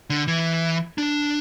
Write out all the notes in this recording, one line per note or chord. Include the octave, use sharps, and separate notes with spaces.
D3
E3
D4